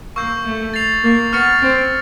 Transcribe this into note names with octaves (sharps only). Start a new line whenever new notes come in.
A#3 C#6 E6 G6
A3
A6 C7 F7
A#3
B3 C#6 F6 A6 C#7
C4